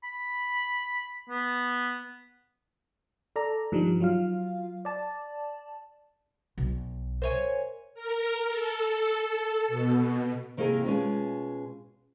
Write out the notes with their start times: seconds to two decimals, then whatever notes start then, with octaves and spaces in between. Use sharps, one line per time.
0.04 B5
1.29 B3
3.36 A4 D5 A#5
3.72 G2 D#3 F3 G3
4.01 F#3 F4 F5
4.85 D5 A5
6.58 B1
7.22 A#4 C5 C#5 E5 G#5
7.95 A#4
8.48 A4
9.68 B2
10.57 C3 D#3 A#3 E4 G#4 A#4
10.84 B2 G#3 C#4 F4